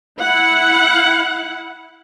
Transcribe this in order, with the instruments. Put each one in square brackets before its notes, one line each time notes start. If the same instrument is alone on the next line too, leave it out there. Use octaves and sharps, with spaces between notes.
[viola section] E4 F#5